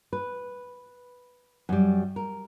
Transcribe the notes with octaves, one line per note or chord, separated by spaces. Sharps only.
B4
F#2 G3
A#4